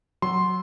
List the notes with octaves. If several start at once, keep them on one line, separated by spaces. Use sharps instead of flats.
F#3 C6